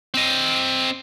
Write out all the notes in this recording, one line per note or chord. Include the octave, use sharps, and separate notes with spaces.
C4 D#5